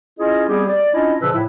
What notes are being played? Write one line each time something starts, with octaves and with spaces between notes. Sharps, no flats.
C#4 E4 F4 G#4 D#5
G3 B3 C4 G4 G#4
D5
C#4 D4 E4 F4 D#5
A#2 C#3 F3 B4 E6
A2 E4